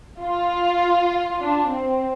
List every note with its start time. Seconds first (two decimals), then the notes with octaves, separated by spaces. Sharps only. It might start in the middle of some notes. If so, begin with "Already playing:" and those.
0.20 F4
1.40 D4
1.70 C4